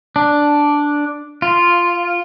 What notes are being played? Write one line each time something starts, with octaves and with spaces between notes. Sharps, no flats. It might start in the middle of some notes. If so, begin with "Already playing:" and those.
D4
F4